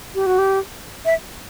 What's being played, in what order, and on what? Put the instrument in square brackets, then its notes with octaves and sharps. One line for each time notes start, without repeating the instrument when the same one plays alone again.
[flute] G4
F#4
G4
E5